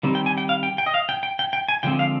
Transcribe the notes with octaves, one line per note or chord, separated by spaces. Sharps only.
D#3 G3 C4
G5
G#5
G5
F5
G5
G5
D#5
F5
G5
G5
G5
G5
G#5
D3 F3 G#3 C4 G5
F5